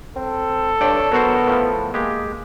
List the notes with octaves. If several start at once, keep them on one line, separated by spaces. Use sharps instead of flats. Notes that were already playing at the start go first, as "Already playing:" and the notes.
C4 A4
G2 D4 C#5 D5 G5
F#3 B3 F#4 A#4 C5
A2 F3
G#3 A#3 G4 G#4